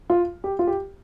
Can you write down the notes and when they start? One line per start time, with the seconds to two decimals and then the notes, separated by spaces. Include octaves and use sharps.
0.10 F4
0.44 G4
0.59 F4
0.67 G4